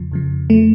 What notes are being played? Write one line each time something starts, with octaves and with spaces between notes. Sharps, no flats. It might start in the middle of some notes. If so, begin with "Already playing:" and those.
Already playing: F2 C#3 F3
F2 C#3 F3
F2 F3 A3